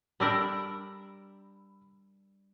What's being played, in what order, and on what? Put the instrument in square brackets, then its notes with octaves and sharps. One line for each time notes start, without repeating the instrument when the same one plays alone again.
[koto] G3 D4 A#4 [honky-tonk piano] B5 E6